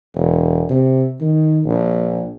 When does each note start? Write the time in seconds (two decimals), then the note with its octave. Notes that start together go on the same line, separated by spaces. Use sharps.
0.15 E1
0.70 C3
1.21 D#3
1.65 A#1